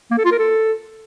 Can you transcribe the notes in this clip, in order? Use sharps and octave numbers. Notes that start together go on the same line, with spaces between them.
A#3
A4
F4
A#4
A4